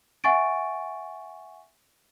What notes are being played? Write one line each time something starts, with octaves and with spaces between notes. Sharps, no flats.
E5 F#5 G#5 C#6 A6 D7